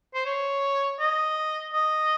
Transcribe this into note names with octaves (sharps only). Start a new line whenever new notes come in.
C5
C#5
D#5
D#5